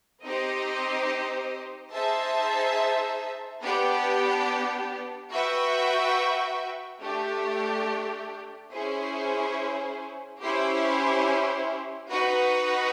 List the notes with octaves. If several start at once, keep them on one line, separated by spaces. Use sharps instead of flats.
C4 D#4 G4 C5 D#5
D#4 G#4 C5 E5 A5
B3 D4 G4
F#4 B4 E5 G5
A3 D4 G4
C#4 E4 G#4 C5
C#4 E4 G4 C5
D#4 F#4 B4